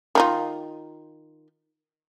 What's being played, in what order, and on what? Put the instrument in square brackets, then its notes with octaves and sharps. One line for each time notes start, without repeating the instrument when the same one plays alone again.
[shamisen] D#3 D#4 F4